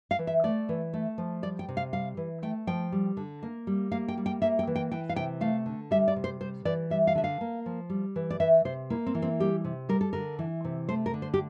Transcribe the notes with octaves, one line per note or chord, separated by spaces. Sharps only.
F5
E3
E5
A3 D5
E3
A3
F3
G3 D5
G5
C3
F5
G3 F5
E3
A3 G5
F3 G5
G3
D3
A#3
G3
A#3 F5
G5
G3
G5
A#3 E5
G5
E3
G5
E3 G5
F5
C3 G5
A3 F5
D3
G3 E5
D5
C3
C5
G3 C5
E3 D5
G3 E5
F5
D3 E5
F5
A#3
F3
G3
E3
D5
E3 E5
C3 C5
A#3 E4
C4
E3
C4
G3 G4
C3
G3 A#4
A4
D3 A#4
E3
C3
A3 C5
A#4
D3
C5
G4